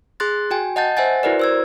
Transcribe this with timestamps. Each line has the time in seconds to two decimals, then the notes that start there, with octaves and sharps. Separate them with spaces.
0.20 G#4 C6 F#6 A6
0.51 F#4 G5 G#5
0.76 D#5 F#5 A5 G6 A6
0.97 C5 E5 F#5 G#5 A6
1.23 E4 F#4 A#4 B4 D5
1.40 C5 E6 G#6